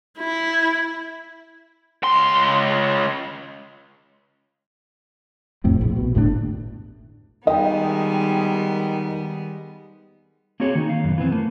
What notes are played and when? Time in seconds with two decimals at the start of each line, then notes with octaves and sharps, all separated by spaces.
0.19 E4
2.03 C#2 C6
5.64 F2 A2 C3
5.81 A#1
5.96 B2
6.15 G1 A2 C#3 D4
7.47 D#3 G3 G#3 B3 D#5 G5
10.60 A#3 C4 F#4 G#4 C#5
10.75 D#3 D#4
10.89 F5
11.04 F#2 B2
11.18 E3 B3 C4
11.32 A3 A#3